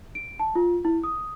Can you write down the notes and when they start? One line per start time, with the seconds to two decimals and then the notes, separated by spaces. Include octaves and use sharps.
0.15 D7
0.39 A5
0.55 F4
0.85 E4
1.04 D#6